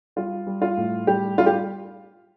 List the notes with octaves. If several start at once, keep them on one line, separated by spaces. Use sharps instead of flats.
G3 F4
G3
F4
A2
G3 G4
G3 F4
G4